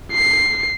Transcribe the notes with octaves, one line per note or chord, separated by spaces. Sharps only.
C7